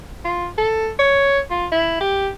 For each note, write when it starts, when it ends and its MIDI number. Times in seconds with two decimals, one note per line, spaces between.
0.25 0.48 65
0.58 0.89 69
0.99 1.40 73
1.50 1.66 65
1.72 1.96 64
2.01 2.28 67